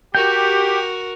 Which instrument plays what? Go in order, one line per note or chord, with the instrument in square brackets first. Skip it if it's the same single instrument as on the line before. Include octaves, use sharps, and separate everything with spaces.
[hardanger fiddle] F#4 A#4 [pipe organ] G4 [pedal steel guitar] G5